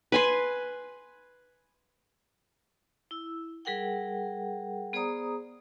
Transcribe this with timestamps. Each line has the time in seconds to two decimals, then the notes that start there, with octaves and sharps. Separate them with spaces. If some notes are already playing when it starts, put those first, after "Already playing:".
0.12 B4 G#5 C6
3.11 E4 E6
3.65 G3 G#4 A#4 F#5 G5
4.93 B3 G#4 C5 D5 A#5 D#6